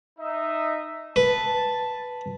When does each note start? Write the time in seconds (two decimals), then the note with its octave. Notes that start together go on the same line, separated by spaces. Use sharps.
0.19 D#4 D#5 E5
1.16 B4 A5